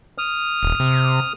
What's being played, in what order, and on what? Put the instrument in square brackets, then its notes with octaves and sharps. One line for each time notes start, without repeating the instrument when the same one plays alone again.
[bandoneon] D#6 F6
[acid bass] D#1
C3